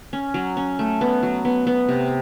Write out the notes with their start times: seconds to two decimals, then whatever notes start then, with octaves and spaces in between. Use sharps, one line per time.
0.13 C#4
0.34 F#3
0.57 C#4
0.79 A3
1.01 B3
1.23 F#3
1.45 B3
1.67 B3
1.89 C3